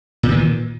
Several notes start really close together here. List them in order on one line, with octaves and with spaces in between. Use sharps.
A#2 G3 E3 D#3